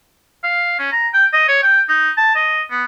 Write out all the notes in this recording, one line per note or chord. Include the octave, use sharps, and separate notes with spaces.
F5
C#4
A#5
G5
D#5
C#5
G5
D#4
A5
D#5
B3